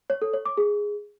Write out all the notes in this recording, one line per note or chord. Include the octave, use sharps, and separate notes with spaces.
C#5
A4
C#5
D6
G#4